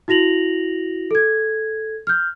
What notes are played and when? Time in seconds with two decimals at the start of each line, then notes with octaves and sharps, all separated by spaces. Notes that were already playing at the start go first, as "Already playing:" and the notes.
0.08 E4 F#4 A#6 F7 F#7
1.11 A4 G#6
2.07 F6 G6